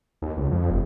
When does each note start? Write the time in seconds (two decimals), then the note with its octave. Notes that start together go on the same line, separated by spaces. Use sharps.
0.22 D#2
0.37 C#2
0.51 F2
0.70 F1